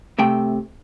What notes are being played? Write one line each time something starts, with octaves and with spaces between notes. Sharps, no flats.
C3 A3 G5